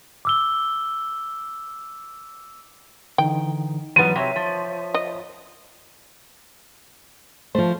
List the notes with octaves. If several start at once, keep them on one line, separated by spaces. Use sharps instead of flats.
D6 E6 G7
D3 E3 D#4 G5
G#2 E3 F#3 G3 B3 D#7
C3 F#3 C#5 E5 B6
F3
D#5
F3 A3 C5